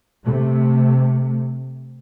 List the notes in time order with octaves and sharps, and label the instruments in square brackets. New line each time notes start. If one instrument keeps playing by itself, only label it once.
[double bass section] C3 A3